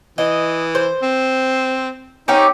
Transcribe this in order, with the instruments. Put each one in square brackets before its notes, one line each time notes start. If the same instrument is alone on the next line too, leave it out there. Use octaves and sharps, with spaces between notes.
[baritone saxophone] E3 [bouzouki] D#5
[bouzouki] C5
[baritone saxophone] C4
[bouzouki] C4 C#4 G4 [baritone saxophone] D#4